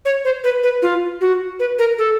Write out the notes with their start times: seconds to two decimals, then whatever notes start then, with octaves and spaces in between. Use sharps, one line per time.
0.05 C#5
0.25 C5
0.44 B4
0.63 B4
0.82 F4
1.21 F#4
1.60 B4
1.79 A#4
1.98 A4